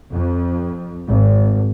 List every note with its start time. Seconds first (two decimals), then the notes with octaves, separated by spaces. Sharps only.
0.11 F2
1.07 G#1